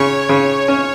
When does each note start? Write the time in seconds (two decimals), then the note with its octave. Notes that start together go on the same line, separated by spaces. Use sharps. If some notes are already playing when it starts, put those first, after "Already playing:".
Already playing: C#3 C#5
0.29 C#3
0.68 C#4